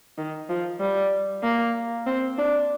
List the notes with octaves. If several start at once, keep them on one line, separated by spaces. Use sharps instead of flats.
D#3
F3
G3
A#3
C4
D4